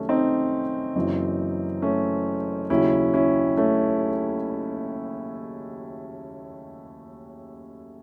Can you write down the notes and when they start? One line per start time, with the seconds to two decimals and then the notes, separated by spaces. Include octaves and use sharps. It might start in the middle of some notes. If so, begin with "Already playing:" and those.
Already playing: C2 C3 D#3 F#3 A3 C#4
0.09 C4 D#4
0.96 F#1 F#2 E3
1.82 A3 C#4
2.70 D#2 C#3 F#3 C#4 E4
3.14 C#4 E4
3.57 A3 C#4